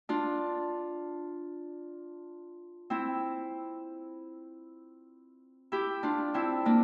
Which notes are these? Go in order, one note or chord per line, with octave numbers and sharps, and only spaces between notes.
D4 F4
C4 E4
E4 G4
D4 F4
C4 E4
A#3 D4